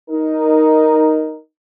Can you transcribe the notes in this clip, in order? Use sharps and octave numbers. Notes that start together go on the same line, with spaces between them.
D#4 A#4